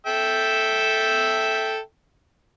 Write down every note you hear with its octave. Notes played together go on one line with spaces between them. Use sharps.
A4 E5 G5